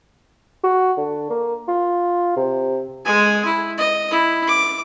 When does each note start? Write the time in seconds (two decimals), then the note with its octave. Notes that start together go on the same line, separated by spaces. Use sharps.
0.64 F#4
0.97 D3
1.30 A#3
1.68 F4
2.37 C3
3.05 G#3 G#5
3.45 E4
3.78 D#5
4.11 E4
4.47 D6